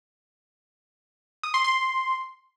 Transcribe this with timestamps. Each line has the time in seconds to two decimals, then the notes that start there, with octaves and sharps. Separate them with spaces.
1.43 D#6
1.54 C6
1.64 C6